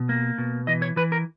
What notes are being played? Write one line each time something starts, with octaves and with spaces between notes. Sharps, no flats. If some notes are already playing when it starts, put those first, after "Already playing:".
Already playing: B2
A#3
B2
E3 D#5
C#5
E3 B4
A#4